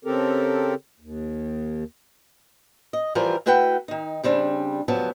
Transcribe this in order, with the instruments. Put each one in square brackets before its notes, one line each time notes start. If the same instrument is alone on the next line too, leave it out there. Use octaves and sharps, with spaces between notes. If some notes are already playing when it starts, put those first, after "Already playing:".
[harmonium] C#3 C4 G4 A4 A#4
D#2
[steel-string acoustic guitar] D#5
E3 F3 G3 F4 A#4
A3 E4 F#4 B4 F#5 G5
D#3 D#4
C#3 G3 C4 D4
D2 C3 F3 F#3 B3 A5